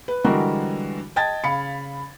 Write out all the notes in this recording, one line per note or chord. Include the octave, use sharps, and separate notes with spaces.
B4
D3 E3 G3 G#3 F#4 A#4
D#5 G5 A5 G#6 A6
C#3 F5 B5 C#7